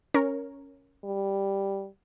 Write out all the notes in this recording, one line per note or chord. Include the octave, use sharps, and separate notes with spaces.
C#4 A#4 C#5
G3